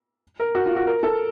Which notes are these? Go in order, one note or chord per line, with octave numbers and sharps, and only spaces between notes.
A#4
F#4
F4
F#4
A#4
A4